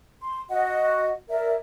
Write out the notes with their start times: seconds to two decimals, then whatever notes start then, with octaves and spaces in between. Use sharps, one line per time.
0.20 C6
0.49 F#4 D#5 F#5
1.29 A#4 D5 E5